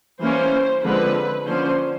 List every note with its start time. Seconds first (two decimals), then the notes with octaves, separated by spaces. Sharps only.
0.20 E3 G3 A#3 C#4 C5
0.83 D3 F3 G#3 C4 B4
1.46 D3 F3 A#3 C#4 C5